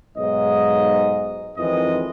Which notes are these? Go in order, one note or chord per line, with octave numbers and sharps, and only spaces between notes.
B1 G#2 D#5
F2 D#3 E3 G#3 D#5